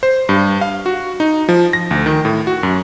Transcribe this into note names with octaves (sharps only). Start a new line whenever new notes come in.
C5
G2
F5
F#4
D#4
F3
A#6
D2
D#3
A2
F#4
F#2